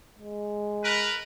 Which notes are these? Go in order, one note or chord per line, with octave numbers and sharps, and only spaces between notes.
G#3
A#4 B4